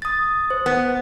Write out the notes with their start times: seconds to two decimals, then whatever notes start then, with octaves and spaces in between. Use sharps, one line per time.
0.02 D#6 A6
0.50 C5
0.66 B3